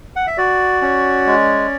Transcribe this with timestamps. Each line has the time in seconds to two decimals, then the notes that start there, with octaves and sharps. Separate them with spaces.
0.16 F#5
0.27 E5
0.37 F#4 D5
0.82 C#4
1.26 G#3